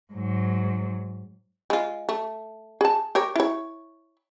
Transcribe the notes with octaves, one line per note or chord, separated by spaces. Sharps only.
G#2 F#3
G#3 F4
A3
G#4 A5
G4 A#4 C#5
E4 C#5